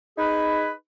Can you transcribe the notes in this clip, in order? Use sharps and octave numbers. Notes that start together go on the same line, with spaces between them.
D#4 G#4 B4 B5